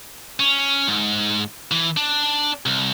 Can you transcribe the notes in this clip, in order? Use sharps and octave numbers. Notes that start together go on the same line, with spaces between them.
C#4
G#2
E3
D4
C2